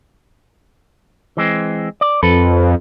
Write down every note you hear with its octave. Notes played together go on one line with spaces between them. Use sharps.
E3 G#3 C4
D5
F2 A4 B4